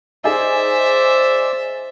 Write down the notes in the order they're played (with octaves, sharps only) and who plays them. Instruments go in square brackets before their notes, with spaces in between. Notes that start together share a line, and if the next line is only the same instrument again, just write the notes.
[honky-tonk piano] D#4 G#4 [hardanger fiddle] C5 E5 [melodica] D5 E6